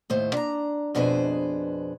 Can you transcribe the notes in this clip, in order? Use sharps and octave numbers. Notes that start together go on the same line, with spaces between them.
D#2 A2 C5
D4 A#5
F2 B2 D4 G#4 B4 C5